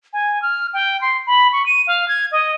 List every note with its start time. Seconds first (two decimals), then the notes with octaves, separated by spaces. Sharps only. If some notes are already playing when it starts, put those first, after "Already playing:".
0.13 G#5
0.42 F6
0.73 G5
1.01 C6
1.27 B5
1.52 C#6
1.66 D#7
1.87 F5
2.08 G#6
2.32 D#5